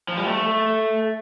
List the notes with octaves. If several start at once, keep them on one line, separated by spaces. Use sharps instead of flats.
F3
G3
A3